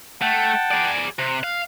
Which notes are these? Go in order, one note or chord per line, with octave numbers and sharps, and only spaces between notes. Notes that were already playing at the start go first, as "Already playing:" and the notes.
A3 F#5 G5 A5
G#4 D5
C3 F#6
F5